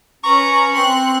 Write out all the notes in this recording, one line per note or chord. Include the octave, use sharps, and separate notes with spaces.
C#4 B4 A#5 C#6
C4 C6 F#6